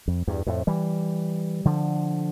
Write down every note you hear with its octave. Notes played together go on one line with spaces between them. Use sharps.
F2
E2 G2
F2 A2
E3 G3
D3 F3